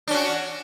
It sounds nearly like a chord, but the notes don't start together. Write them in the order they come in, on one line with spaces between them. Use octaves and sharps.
D4 C#4 F#4